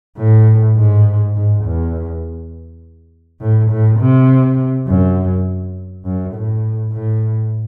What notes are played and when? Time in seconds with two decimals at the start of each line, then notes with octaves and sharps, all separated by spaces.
0.18 A2
0.77 G#2
1.35 G#2
1.65 E2
3.41 A2
3.71 A2
3.99 C3
4.87 F#2
6.05 F#2
6.34 A2
6.93 A2